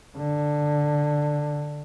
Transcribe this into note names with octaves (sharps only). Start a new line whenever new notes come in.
D3